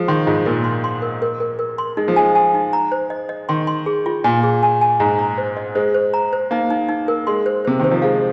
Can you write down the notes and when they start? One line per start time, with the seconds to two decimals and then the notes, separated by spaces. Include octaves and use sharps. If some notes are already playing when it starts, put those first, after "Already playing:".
Already playing: F3 G#3
0.08 D#3 C6
0.27 G#2 F4
0.46 A#2 A#4
0.64 C6
0.84 C6
1.02 A#4
1.22 A#4
1.40 A#4
1.59 A#4
1.78 C6
1.97 G#3 D#4
2.08 F3
2.16 G#3 G#5
2.35 G#5
2.54 D#4
2.73 A#5
2.92 C5
3.10 D#5
3.29 D#5
3.49 D#3 C6
3.67 C6
3.86 G#4
4.06 F4
4.24 A#2 G#5
4.43 G#4
4.63 G#5
4.81 G#5
5.00 G#2 A#5
5.19 A#5
5.38 C5
5.57 D#5
5.75 G#3 C5
5.94 C5
6.14 A#5
6.33 C5
6.51 A#3 D#4
6.70 D#4
6.89 D#4
7.08 A#4
7.27 G#3 C6
7.46 C5
7.65 C3 C5
7.79 D#3 C5
7.91 F3
8.02 G#3 F5